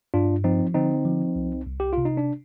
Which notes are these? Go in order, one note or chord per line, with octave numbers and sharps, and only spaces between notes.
G2 D4 F4
F3 C4 D#4
D3 C4 D#4
F3
C2
C2
G4
C3 F4
D#4
D4